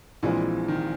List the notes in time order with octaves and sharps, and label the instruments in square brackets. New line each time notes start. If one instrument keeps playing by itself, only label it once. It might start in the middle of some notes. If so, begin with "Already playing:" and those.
[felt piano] A#1 A#2 F3 G#3 C4 [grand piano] E3
[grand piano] D#3